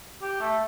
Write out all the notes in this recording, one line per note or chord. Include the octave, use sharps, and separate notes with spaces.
G4
A3